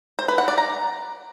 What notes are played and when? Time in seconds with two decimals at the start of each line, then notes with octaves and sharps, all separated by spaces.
0.19 C5
0.28 B4
0.38 F#5
0.48 D5
0.58 A#5